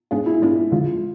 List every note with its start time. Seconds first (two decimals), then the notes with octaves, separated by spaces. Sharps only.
0.11 G#2 G#3 B3 D4 F4 G#4
0.26 E4
0.42 G#2 G#3 B3 D4 F4
0.71 F2 D3 G#3 F4